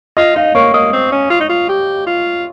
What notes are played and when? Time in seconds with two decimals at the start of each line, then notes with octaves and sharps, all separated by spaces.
0.17 F4 D#5
0.35 D#4 F5
0.55 A#3 C#5 C#6
0.73 A#3 D#5 D#6
0.93 C4
1.12 C#4
1.30 F4
1.40 D#4
1.49 F4
1.69 G4
2.06 F4